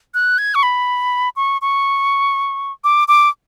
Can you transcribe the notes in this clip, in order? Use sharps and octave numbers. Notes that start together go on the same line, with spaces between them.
F#6
G#6
C#6
B5
C#6
C#6
D6
D6